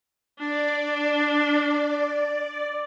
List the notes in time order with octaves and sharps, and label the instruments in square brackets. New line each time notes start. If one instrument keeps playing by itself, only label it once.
[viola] D4 [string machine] D5